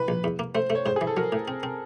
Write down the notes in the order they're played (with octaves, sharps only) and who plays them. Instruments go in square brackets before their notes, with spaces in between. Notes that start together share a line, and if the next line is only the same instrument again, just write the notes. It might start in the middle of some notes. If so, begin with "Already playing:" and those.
Already playing: [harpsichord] E3 [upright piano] B4
[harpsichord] A#1
E2
A#3
[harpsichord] A3 [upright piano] C5
[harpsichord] A3
[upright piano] C#5
[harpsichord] G#2 [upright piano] C5
[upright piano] G#4
[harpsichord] E3
[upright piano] A4
[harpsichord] F#3 [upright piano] A#4
[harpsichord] A2
C4
C4